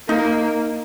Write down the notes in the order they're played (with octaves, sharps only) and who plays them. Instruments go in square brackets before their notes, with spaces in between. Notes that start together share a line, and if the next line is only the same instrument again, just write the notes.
[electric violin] A#3 [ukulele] D#4